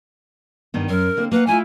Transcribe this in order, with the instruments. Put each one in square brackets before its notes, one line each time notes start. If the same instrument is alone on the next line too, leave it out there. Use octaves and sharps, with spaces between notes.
[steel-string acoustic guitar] G2 D#3 B3
[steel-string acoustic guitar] F#2 [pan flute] A#4
[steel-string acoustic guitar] D3 A#3 C4
[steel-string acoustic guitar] A#3 F#5 [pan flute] B4
[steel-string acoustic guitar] A3 E4 F4 [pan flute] G#5